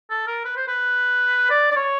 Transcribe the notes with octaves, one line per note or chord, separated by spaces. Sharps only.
A4
A#4
B4
C5
B4
D5
D5
C#5